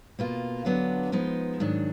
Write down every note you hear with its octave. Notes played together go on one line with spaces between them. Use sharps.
B2 A#3 F4
D3 F#3 B3 D4 F4
F3 G#3 B3 D#4
G#2 D#3 F#3 D4